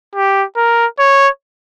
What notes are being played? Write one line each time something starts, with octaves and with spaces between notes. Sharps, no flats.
G4
A#4
C#5